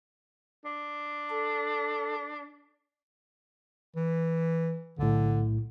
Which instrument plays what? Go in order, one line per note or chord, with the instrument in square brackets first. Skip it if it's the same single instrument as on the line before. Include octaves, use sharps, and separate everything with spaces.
[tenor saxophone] D4
[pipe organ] A4
[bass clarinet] E3
[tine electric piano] B1 A2 [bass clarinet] D3